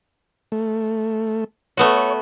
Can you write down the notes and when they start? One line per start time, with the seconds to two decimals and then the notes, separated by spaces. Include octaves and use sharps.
0.52 A3
1.77 A3 B3 F#4 C#5